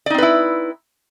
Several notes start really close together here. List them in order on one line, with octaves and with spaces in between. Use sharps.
D5 D#4 C4 B4 E4